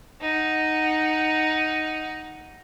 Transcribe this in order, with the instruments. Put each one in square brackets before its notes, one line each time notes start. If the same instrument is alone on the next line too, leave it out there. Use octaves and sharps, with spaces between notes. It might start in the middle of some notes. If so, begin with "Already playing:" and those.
[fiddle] D#4 F#5